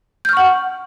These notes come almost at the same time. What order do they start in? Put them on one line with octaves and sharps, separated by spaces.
G6 F6 C#6 F#5